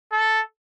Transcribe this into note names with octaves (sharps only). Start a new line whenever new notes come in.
A4